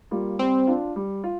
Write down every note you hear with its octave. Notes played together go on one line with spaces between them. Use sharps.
G3 A#3 F4
G3 C4
D4 F4
G3
F4